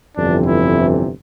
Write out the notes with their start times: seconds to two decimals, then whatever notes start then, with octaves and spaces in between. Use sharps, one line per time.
0.17 G1 F2 C3 E3 D4
0.46 E4